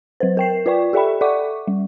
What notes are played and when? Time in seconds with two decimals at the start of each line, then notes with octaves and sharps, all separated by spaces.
0.20 F#3 B4 C5
0.37 A#4 G5 C7
0.66 F4 B4 D5 G5 C#6
0.93 G4 A4 D5 E5 G5 B5
1.21 A4 D5 E5 F#5 C#6 D6
1.68 G3